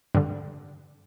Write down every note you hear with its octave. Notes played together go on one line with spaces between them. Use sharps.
G2 D3